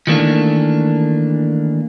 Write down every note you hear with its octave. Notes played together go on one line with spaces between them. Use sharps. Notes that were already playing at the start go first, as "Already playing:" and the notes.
D#3 E3 G3 A3 A#3 D4